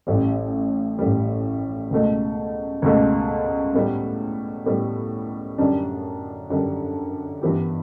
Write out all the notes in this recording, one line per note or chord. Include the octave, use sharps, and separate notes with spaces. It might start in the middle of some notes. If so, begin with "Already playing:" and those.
A1 A2 G3
A1 A2 G3
C#2 B2 A3
C#2 B2 A3
A2 G3 B3
A2 G3 B3
F#2 D3 G3 D4
F#2 D3 G3 D4
G2 E3 B3 E4 G4